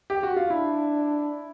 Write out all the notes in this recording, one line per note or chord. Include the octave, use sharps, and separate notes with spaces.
G4
F#4
F4
D4 E4